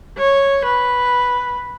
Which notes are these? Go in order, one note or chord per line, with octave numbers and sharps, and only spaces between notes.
C#5
B4